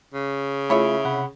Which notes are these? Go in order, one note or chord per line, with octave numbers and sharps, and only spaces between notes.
C#3
A3 E4 F4 G#4 C#5 E5
C3 F#5 B5